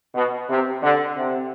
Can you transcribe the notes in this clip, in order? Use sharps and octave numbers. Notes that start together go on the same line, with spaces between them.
B2
C3
D3
C3